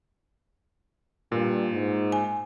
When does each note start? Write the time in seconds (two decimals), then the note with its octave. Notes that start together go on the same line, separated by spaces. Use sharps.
1.32 G2 A#2
1.72 G#2
2.12 G#5